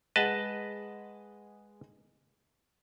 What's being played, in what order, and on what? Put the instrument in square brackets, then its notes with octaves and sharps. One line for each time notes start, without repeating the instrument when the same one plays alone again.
[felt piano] G#3 G#4 F#5 [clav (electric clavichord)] B4 D#5 A5